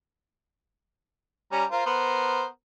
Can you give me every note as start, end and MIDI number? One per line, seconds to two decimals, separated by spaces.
1.52 1.65 55
1.52 1.65 61
1.52 1.65 82
1.71 1.85 65
1.71 1.85 70
1.71 1.85 72
1.86 2.45 59
1.86 2.45 70
1.86 2.45 72